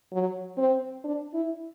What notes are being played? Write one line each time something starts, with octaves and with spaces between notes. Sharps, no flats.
F#3
C4
D4
E4